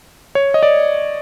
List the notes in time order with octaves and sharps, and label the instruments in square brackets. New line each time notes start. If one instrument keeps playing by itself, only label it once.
[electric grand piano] C#5
D#5
D5